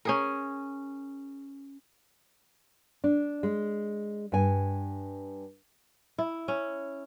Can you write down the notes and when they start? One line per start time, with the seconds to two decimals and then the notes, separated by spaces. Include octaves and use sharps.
0.05 C#4 G#4 A#4
3.04 D4
3.43 G#3
4.32 G2 G#5
6.19 E4
6.48 C#4